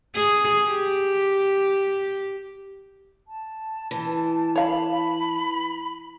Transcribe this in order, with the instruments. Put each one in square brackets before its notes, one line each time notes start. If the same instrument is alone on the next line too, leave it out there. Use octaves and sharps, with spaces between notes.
[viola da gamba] G#4
G4
[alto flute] A5
[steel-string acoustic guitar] E3
[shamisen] C#5 F5 [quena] B5